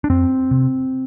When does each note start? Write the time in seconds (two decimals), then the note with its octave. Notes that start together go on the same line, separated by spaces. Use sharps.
0.04 D4
0.09 F2 C4
0.51 C3